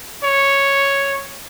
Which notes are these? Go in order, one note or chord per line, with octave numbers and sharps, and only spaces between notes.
C#5